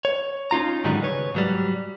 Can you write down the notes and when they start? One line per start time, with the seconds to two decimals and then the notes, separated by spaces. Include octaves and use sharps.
0.05 C#5
0.51 C#4 D#4 F4 A#5
0.84 G#2 D3 D#3 F#3 G3 D#4
1.02 C#3 B4 C#5
1.34 G#2 F#3 G3